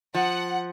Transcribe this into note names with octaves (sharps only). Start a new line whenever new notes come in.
F3 F#5